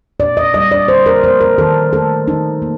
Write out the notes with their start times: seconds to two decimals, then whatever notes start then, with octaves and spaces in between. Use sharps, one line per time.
0.20 A#2 D5
0.37 D#5
0.54 G3 A#3 D#5
0.71 D5
0.88 D3 C5
1.06 A#4
1.24 F3 A#3 C5
1.41 A#4
1.58 D#3 A4
1.92 A3 A4
2.27 D#3 D#4
2.62 A#3